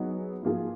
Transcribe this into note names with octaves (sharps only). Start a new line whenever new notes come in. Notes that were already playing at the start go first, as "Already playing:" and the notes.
Already playing: F#3 B3 D#4 G#4
G#2 F3 A#3 F4 G#4